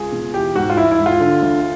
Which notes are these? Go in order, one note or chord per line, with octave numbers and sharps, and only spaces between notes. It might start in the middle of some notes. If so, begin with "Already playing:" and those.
Already playing: C#2 G#4
B2
E3 G4
G#2 F#4
F4
E3 E4
E4
G#2
F4
D3
D2